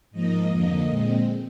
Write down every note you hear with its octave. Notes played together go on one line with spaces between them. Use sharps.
G#2 F3 A#3 D#5
F2 D3 F3 A#3
A#2 G#3 C4